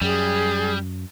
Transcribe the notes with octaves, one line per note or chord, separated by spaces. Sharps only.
F#2 G3 G#4